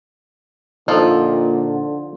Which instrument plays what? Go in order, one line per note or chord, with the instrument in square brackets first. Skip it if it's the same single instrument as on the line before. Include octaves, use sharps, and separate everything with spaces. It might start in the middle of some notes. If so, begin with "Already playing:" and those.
[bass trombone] A#2 [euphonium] D3 [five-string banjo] F3 F4 [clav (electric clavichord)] D#4 A4